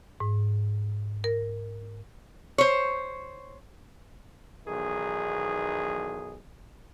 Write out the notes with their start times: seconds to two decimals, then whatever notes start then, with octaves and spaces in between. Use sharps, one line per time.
0.20 G#2
1.24 A#4
2.58 C5 C#5
4.67 B1 E2 D#3 G#4